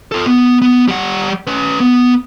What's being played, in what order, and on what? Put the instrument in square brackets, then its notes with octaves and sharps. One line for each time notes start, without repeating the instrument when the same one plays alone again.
[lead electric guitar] F4 A4
B3
B3
G3 F#5
C#4 B4
B3